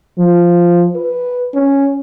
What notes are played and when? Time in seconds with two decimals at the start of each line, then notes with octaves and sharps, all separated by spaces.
0.18 F3
0.96 B4
1.55 C#4